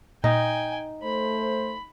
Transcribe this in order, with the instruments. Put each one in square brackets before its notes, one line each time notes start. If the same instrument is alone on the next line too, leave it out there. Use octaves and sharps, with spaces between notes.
[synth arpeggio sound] A#2 [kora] D#4 [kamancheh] G5 G#5
[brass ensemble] A3 C5 [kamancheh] B5